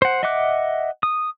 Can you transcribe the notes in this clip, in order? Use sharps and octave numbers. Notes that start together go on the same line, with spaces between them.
C5 F#5
D#5 E5 F#5 D6 F#6
D#6